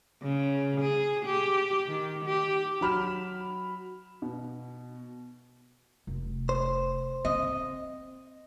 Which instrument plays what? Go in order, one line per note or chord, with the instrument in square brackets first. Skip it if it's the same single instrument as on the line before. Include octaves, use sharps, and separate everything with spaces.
[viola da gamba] C#3
G#4
G4
D#3
G4
[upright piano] F#3 B5 F6 E7
B2
[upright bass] F1
[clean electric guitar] C5
[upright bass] C4 [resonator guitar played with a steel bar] D#5